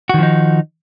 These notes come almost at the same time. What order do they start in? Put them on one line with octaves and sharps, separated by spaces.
F#4 D#3 F3 D#4